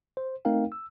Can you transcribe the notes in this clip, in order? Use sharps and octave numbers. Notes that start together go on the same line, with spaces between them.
C5
A3 C4 D#4 A#4 F5 G5
E6